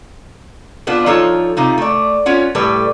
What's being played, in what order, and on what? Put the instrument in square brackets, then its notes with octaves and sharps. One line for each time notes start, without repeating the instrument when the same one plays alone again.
[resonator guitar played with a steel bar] B2 B3 D4 F4
F3 D#4 F4 A4 C#5
C3 D#4 F4
A3 D5
C#4 F4 C#5 F#5
A2 G3 A4 B4